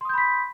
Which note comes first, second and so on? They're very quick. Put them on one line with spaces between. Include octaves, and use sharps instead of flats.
C6 D#6 G6 B5 B6